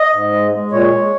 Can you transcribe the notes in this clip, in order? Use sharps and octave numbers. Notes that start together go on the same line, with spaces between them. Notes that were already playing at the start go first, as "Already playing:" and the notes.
Already playing: D#5
G#2
G#3
G#3
A#2 C#5
G#3